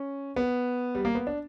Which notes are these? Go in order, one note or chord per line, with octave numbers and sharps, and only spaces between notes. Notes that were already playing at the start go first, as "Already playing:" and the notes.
Already playing: C#4
B3
G3
A#3
B3
D4